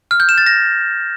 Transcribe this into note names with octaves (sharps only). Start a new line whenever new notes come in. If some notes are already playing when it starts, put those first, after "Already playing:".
F6
G6
E7
A6
A#6